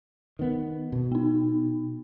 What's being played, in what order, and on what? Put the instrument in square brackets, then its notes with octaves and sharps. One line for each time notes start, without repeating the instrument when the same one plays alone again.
[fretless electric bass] D#3 B3
B2
[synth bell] B3 D#4